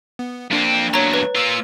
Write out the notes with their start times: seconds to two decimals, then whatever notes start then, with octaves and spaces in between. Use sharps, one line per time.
0.19 B3
0.51 F2 A#3 C4 D4
0.94 E2 F#3 C#5 A#5
1.14 B4
1.36 A#3 F4 E6